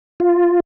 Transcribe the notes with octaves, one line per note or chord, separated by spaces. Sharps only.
F4